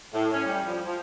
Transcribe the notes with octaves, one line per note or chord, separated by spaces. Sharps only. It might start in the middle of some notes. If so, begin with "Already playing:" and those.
A2
C#4
G3
F3
F3